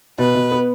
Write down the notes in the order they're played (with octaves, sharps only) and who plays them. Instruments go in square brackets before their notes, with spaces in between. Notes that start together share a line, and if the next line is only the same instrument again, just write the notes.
[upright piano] B2 [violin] B4
[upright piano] B2
B3